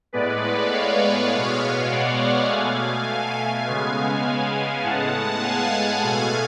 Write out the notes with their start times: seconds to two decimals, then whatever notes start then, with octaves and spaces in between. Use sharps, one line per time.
0.13 A2 G#3 B3 B4 D5
0.72 C#5 F5
1.31 B2 G#3 B3
1.89 D5 F#5
2.49 B2 A3 F5 G#5
3.66 C#3 G#3 B3
4.83 A2 G#3 B3 F#5 A5
5.42 F5 G#5
6.02 B2 A3